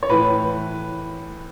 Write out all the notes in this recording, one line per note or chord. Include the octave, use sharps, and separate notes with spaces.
C#5
A2 E3 B4